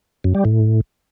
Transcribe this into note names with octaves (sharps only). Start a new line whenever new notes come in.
F#2
G3
A2